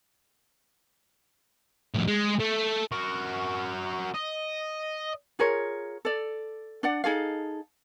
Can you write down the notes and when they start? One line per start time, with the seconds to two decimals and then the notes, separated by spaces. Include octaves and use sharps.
1.95 F2 A2
2.08 G#3
2.40 A3
2.92 F#4 A#4
4.14 D#5
5.39 F4 G#4 A#4 C#5
6.05 A4 D5
6.83 D4 D5 F#5
7.04 D#4 G#4 A4 F5